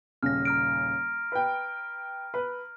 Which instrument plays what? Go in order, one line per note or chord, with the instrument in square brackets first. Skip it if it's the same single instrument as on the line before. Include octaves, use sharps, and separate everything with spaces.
[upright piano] D#1 C#3 [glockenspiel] F6 A#6
[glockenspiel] A#5 F6 D7
[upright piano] B4 G5
B4